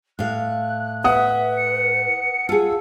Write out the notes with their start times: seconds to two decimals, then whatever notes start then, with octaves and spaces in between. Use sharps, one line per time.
0.19 A2 F5 F#6
1.04 B4 E5 F#5 D#6
1.57 C#7
2.49 F4 G#4 A5 E6